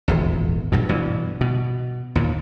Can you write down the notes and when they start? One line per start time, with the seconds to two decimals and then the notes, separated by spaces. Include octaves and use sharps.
0.08 D#1 G#1 E2
0.72 A#1 G2 B2
0.89 G2 B2 E3
1.41 B2
2.15 D#2 A#2